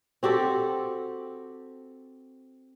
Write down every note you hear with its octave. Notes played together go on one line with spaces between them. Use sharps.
C4 F#4 G4 A4